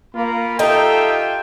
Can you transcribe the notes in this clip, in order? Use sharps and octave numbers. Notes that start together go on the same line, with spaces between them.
A#3 F4 A#4 B5
D#4 F4 G4 A4 E5 G5